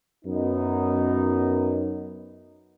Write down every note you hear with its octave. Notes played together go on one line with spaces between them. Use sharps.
F#2 B3 D#4